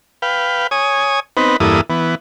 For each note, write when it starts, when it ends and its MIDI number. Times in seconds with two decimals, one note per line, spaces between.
0.22 0.67 71
0.22 0.67 77
0.22 0.67 79
0.71 1.20 73
0.71 1.20 80
0.71 1.20 87
1.37 1.57 59
1.37 1.57 60
1.37 1.57 63
1.37 1.57 71
1.60 1.81 40
1.60 1.81 43
1.60 1.81 58
1.60 1.81 64
1.60 1.81 69
1.60 1.81 87
1.90 2.15 52
1.90 2.15 59